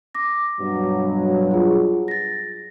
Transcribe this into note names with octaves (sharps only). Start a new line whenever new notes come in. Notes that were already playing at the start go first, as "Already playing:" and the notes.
D6 A#6
G2 B2 F#3
F4 G#4
A6 A#6